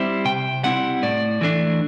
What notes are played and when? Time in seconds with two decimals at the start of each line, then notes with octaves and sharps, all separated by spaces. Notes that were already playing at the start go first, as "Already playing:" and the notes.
Already playing: G3 C4 E4
0.25 C3 G5
0.63 G3 C4 E4 F#5
1.03 A2 D5
1.41 E3 A3 D4